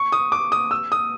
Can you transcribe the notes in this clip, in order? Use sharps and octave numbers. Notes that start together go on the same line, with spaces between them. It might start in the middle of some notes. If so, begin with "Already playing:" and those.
Already playing: C#6
D#6
D6
D#6
E6
D#6